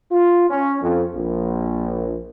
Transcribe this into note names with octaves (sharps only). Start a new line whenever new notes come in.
F4
C#4
F2
A#1